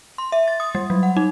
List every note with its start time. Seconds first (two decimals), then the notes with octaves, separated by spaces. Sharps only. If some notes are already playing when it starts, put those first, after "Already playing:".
0.18 C6
0.32 E5
0.48 A6
0.60 D#6
0.75 G3
0.90 F#3
1.03 F#5
1.17 D#4